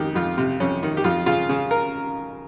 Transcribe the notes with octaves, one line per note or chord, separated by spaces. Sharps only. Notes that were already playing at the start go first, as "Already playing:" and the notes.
Already playing: F2 D#3 G4
F2 F4
C3
F2 C#4
D#3
G4
F2 F4
C#3 F4
C#3
A#4